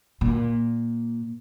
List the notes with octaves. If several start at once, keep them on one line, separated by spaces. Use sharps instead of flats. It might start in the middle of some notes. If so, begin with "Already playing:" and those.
A#2